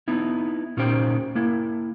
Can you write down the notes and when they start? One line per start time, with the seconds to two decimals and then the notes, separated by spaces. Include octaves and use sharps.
0.08 B3 D#4 E4
0.77 A#2 C#4 D#4 G4 C5 G5
1.35 A#3 E4